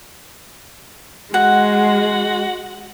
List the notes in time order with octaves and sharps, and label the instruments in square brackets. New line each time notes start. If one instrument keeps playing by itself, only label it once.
[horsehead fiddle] G#3 [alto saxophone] F#4 [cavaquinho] F#5